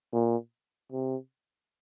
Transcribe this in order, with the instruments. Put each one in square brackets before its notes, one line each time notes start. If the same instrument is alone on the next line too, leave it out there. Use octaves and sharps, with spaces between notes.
[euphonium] A#2
C3